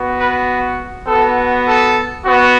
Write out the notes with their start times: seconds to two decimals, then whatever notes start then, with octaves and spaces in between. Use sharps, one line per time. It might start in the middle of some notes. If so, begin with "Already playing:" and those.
Already playing: B3 F#4
0.18 B4
1.07 B3 F#4 A4
1.66 A4
2.26 B3 F#4